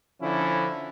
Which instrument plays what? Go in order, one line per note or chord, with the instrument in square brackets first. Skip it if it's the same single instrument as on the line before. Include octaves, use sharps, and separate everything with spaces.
[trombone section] D3 F3 C#4 E4